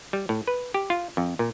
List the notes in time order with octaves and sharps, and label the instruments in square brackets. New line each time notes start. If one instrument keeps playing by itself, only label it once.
[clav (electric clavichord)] G3
A2
B4
G4
F4
F2
A#2